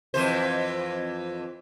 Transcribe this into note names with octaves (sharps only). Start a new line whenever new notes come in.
F2 E3 C5